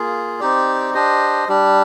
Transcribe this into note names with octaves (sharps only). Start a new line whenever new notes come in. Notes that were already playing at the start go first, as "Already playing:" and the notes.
Already playing: A#3 F4 G#4
C4 D#4 G4 D5
D4 G4 C5 D#5
G3 D4 G4